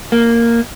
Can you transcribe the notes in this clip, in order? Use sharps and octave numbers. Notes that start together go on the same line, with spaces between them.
A#3